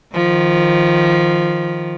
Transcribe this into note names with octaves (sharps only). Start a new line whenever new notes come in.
D#3 F3